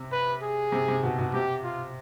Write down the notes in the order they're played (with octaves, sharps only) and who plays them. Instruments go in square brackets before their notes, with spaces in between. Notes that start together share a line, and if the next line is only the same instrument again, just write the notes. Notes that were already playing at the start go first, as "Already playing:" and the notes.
Already playing: [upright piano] C3
[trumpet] B4
G#4
[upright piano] C3
C3
B2
B2
[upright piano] C3 [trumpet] G4
[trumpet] F4